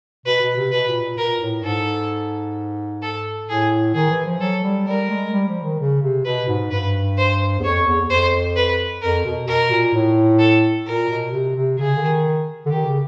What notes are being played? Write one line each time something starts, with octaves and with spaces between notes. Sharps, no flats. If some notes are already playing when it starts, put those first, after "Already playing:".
B2 B4
B2
C3
B2 B4
A#2
A#2
A#2 A#4
A2
G#2 A4
A4
A2 G#4
D#3 G#4
E3
F3
F#3 A4
G3
G3 A#4
G#3
G3
F3
D#3
C#3
C3
B2 B4
G#2
G2 B4
C5
E2
F2 C#5
E2
E2
F2 C5
B4
F2 A#4
B2
B2 A#4
A#2
A2
A4
A#2 A#4
B2
C3
C3
C#3 G#4
D3
D#3
D3
D#3 G4
C#3